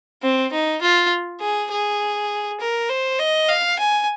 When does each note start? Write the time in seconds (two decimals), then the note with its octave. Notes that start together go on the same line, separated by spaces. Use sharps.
0.22 C4
0.52 D#4
0.82 F4
1.41 G#4
1.71 G#4
2.60 A#4
2.89 C5
3.19 D#5
3.49 F5
3.79 G#5